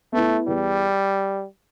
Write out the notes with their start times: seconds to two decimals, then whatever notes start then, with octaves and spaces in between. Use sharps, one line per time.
0.13 A3 B3 E4
0.47 E2 G3